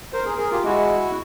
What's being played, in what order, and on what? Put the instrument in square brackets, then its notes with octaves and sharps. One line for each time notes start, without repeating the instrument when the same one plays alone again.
[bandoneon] A#4 C5
G#4 A#4
G#4 A#4
F4 G4
[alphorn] G#3 [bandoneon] E4 F#4